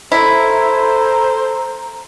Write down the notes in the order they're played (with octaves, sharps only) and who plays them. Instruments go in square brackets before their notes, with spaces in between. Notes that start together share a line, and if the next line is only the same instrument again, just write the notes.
[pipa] E4 [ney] A4 [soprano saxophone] C5 [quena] A#5